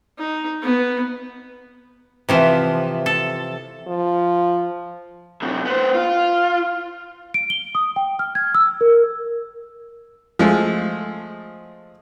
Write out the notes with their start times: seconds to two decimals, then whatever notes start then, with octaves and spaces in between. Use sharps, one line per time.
0.18 D#4
0.62 B3
2.29 C3 E3 F3
3.06 A4
3.87 F3
5.42 F#2 C3
5.65 B3 C5
5.94 F4
7.34 D7
7.50 G7
7.75 D#6
7.96 G5
8.19 F6
8.35 G#6
8.55 E6
8.81 A#4
10.39 F3 G#3 A3